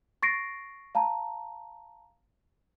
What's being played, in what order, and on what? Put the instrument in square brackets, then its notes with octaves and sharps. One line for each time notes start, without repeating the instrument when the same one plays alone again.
[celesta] C#6 A6 A#6 C7 D7
F5 A5 A#5